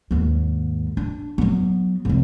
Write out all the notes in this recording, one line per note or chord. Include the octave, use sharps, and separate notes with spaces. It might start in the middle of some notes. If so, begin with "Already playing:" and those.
D#2 G#2
D4
F#3 B3
C2 F2